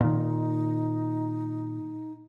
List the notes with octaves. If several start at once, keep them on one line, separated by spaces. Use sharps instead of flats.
A#2 D#3 D#4